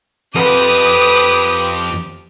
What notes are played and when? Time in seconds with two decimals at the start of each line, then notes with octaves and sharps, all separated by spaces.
0.35 F2 G4 B4 D6 D#6